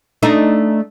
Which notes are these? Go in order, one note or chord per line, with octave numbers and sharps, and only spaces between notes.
A3 D4 D#4